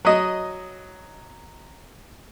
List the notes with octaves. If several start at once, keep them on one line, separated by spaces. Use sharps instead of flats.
F#3 D#5